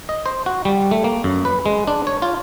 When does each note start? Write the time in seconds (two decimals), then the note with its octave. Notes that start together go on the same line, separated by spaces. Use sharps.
0.09 D#5
0.26 C5
0.46 F#4
0.65 G3
0.91 A3
1.04 A#3
1.24 F#2
1.45 B4
1.66 G#3
1.87 D4
2.07 C#5
2.22 F4